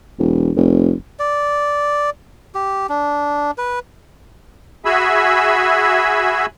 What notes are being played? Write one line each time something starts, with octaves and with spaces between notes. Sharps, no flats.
E1
F1
D5
G4
D4
B4
F#4 G#4 E5 G#5 B5 E6